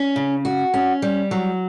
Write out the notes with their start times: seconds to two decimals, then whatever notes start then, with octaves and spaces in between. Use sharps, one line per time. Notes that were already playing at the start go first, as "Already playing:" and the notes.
Already playing: C#4
0.16 C#3
0.45 F#4
0.74 C#4
1.02 G3
1.31 F#3